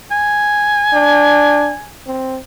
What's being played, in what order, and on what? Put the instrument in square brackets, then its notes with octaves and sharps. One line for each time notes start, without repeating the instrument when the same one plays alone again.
[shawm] G#5
[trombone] D4
C4